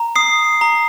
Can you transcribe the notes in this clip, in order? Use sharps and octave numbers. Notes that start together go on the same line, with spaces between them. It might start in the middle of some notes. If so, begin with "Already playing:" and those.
Already playing: A#5
D#6 C7
A#5